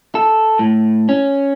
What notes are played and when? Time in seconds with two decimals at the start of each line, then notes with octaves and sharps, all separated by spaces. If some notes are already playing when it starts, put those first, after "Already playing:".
0.15 A4
0.59 A2
1.09 C#4